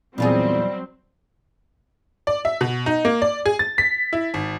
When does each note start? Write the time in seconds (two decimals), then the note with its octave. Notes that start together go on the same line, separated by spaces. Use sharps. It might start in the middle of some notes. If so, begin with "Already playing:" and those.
0.18 E2 A#2 F#3 G3 C4 F4 G#4
2.27 D5
2.45 E5
2.61 B2
2.86 D#4
3.05 A#3
3.22 D5
3.46 G#4
3.59 A6
3.78 B6
4.13 E4
4.34 G#1